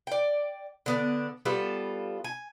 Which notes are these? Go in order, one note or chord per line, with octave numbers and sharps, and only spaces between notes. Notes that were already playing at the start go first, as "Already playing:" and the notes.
D5 G5
D3 B3 D4
G3 B3 F4 A4
G#5